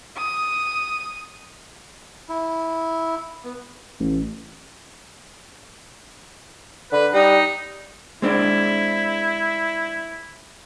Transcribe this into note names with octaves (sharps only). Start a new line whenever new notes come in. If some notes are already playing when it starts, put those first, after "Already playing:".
D#6
E4
B3
A1
D3 B4
G3 D#4
G#3 C4 D4 E4